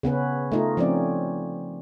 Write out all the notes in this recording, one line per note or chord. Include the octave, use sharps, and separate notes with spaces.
C#3 B3 C#4 B4
A3 D#4 F4
F3 C4 C#4 D#4 D5